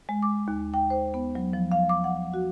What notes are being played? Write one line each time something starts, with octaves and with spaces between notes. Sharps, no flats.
G#3
D6
D#2
G5
C5
B3
F#3
F3
F5
D6
F#5
F#4